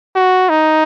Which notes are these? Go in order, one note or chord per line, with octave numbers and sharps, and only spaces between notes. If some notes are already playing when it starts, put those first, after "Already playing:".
F#4
D#4